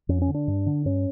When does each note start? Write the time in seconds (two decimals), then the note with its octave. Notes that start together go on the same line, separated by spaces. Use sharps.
0.09 F2 C#4
0.22 C#4
0.28 D3
0.34 D4
0.48 G2
0.66 D3
0.85 G2 C#4